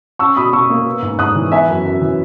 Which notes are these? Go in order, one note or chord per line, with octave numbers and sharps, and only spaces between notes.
C#4 C#6 E6
B2 B5 D#6
B2 C#6 E6
A#3
B3
G#2
G#2 D#6 F#6
E3
B3 E5 G#5
F#2
F#2
E3